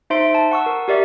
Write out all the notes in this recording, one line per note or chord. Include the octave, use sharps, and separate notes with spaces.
D#4 C5 E5 C6 D7
A5
F#5 C#6 E6
A#4
G4 A#4 D5 E5